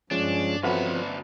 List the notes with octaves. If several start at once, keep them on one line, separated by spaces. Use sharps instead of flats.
G2 F3 G#3 C#4 D4
A1 D2 F3 F#3 B3 C4 B5